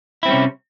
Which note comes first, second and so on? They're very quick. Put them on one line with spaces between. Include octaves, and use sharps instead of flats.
E4 C4 G3 C#4 C3